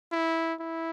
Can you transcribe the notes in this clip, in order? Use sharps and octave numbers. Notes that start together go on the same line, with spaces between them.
E4
E4